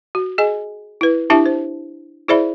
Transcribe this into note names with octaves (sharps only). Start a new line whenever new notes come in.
F#4
G#4 D#5 G#5
E4 B4
D4 E4 G4 E5 A5
C5
E4 G#4 C5 D5 E5 B5